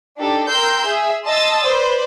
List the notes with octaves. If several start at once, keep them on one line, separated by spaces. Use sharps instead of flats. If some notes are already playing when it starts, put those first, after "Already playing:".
D4 D#4 G4 A4
A#4 G5 C6 E6 G6
G#4 E5
D#5 A5 C6 D#6 E6 A6
B4 C5 D5